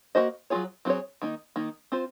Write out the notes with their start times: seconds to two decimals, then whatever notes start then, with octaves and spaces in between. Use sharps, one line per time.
0.15 A#3 C#4 F#4 C5 D#5
0.50 F#3 C4 F4 G#4 C#5
0.85 F#3 C4 F4 G#4 C#5
1.22 D#3 A#3 D#4
1.56 D#3 A#3 D#4
1.92 C4 F4 C5